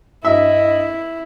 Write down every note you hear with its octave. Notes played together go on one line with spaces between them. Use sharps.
G2 E4 D#5 E5